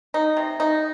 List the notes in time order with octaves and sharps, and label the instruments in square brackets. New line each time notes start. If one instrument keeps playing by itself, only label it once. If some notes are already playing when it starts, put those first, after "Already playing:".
[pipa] D#4
C3
D#4